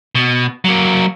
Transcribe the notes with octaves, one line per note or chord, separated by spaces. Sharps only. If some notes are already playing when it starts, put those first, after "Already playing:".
B2
F#3 A#3